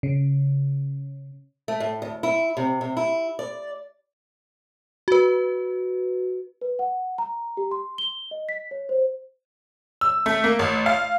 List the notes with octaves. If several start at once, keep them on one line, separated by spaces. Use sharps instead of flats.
C#3
A3
A2
D2
E4
C3
C3
E4
D5
F#4 B4
B4
F#5
A#5
G4
C6
G7
D#5
B6
C#5
C5
E6
A3
A#3
A1
F5